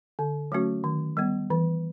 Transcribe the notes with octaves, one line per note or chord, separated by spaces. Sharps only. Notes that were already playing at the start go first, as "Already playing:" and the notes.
D3
F#3 A3 C#4 F#4
D#3
G3 B3
E3